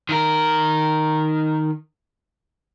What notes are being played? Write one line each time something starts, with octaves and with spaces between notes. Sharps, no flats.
D#3 A#4